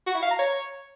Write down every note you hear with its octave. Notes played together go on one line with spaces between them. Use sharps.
F#4
E4
F5
A#5
C#5